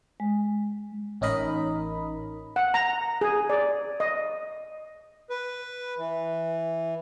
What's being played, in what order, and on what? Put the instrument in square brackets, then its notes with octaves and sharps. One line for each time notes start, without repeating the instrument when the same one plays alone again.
[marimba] G#3
[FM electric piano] A1 C#4 D#4 A#4 D#5 B5
[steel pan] F#5
A#5
G#4
D5
D#5
[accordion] B4
E3